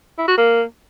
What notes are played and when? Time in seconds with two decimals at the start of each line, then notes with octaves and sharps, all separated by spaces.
0.18 E4
0.28 F#4
0.37 A#3